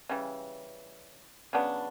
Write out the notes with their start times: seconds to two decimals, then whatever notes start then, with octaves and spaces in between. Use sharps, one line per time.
0.09 C#3 E3 G3
1.53 C#3 F#3 B3 D4